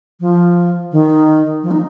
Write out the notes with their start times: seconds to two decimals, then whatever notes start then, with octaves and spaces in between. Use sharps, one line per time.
0.20 F3
0.92 D#3
1.63 F3
1.71 D#4